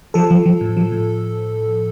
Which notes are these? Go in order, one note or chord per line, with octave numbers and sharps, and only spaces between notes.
F3 A4
F3
F3
A2
F3
A2